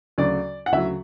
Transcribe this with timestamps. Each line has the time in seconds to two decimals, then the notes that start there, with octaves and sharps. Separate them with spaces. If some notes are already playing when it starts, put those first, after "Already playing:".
0.18 D2 C#3 F#3 D5
0.66 F#5
0.72 D2 C#3 F#3 E5